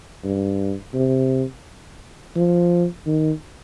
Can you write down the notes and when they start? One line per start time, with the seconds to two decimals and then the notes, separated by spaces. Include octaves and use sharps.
0.24 G2
0.94 C3
2.36 F3
3.07 D#3